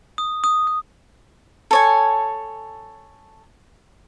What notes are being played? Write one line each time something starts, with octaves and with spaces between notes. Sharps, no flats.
D#6
D#6
D#6
A4 C#5 G#5